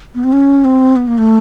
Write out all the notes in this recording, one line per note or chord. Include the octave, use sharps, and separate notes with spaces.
B3
C4
C#4
C4
B3
A#3
A3